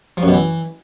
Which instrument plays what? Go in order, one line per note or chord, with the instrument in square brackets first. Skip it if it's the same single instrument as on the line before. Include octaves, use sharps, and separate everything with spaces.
[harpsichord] F3
F#2
B2
E3